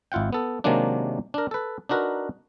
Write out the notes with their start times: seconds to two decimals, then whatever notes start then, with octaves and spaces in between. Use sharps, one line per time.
0.12 G#1 E4 F4 F#5 G5
0.33 B3 A4
0.64 C3 D#3 F#3 G#3 A#3 D4
1.34 D4 A#4
1.51 A4 B4
1.89 D4 D#4 F#4 A#4 B4